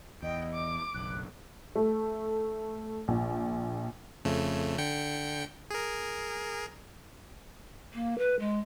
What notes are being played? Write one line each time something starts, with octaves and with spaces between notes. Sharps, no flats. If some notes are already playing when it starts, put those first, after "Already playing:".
E2 D#5 G5
D6
F#1 B1 F#6
A3
A#1
F2 C#3 A3
D3 G5 C#7
G#4 A#4
A#3
B4
G#3